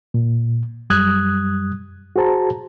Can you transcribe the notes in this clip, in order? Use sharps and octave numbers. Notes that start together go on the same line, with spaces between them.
A#2
F#2 G3 D#6 F#6 G#6
F#4 G#4 C5 A5 A#5